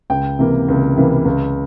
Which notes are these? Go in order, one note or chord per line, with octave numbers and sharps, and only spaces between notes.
C#2 G5
C3 E3 A#3
C#2
C3 E3 A#3
C#2